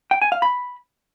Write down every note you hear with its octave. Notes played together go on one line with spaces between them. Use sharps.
G5
G#5
F5
B5